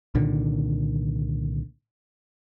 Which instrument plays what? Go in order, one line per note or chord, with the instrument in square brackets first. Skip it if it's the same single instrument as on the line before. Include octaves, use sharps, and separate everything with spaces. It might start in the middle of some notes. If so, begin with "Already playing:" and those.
[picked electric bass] C2 A#2 D3 D#3